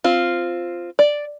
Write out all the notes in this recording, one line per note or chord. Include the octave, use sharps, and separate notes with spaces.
C4 F4
D5